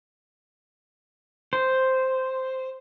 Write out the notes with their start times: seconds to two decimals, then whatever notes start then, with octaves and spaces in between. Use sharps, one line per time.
1.53 C5